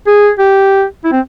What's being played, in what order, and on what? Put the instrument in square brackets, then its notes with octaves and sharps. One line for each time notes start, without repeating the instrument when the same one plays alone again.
[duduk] G#4
G4
E4
C4